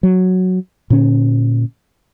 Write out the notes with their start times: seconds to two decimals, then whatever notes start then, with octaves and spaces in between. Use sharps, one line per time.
0.03 F#3
0.90 A#2 D3 C#4